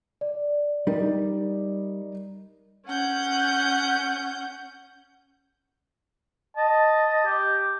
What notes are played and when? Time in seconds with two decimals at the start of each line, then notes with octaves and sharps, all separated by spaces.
0.21 D5
0.87 G3 D#4 A#4
2.86 C#4 F#5 G6
6.57 D#5 A5
7.25 G4